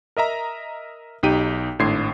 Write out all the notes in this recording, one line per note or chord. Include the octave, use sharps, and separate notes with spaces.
A#4 D#5 E5 A#5
B1 D#4 G4 G5 D#7
G#1 A2 D4 C6 G#6 C7